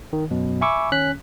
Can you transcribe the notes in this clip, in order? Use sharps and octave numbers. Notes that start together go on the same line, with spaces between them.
D#3
F#2 B2 F#3
E5 G#5 B5 C#6 D6 E6
D#3 C#4 F#6 B6